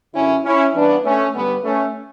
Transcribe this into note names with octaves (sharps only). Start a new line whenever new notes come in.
F#2 D3 C#4 E4
C#4 E4
G2 E3 B3 D4
A3 C#4
G2 D3 G3 B3
A3 C#4